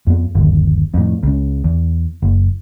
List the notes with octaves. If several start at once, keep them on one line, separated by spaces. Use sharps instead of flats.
F2 B3
G1 D#2
F2 A2
C#2 C#3
E2
F#1